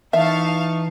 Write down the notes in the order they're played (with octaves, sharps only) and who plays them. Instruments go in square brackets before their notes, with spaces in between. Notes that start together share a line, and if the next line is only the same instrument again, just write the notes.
[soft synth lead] E3 [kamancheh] D#4 C#6 [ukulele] E5 [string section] F5 A5